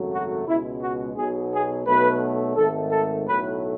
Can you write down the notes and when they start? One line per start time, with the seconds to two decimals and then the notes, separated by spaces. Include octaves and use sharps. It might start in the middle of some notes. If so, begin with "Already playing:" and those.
Already playing: G#1 F#2 C#3 F#3 A3
0.12 F#4
0.47 C#2 B2 G#3 E4
0.82 F#4
1.16 B1 B2 F#3 G#4
1.53 G#4
1.87 B1 B2 F#3 A3 B4
2.56 G#1 G#2 D#3 A3 A4
2.92 A4
3.27 B1 A2 F#3 A3 B4